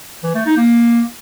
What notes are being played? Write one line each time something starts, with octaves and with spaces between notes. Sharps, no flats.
E3
A3
D#4
A#3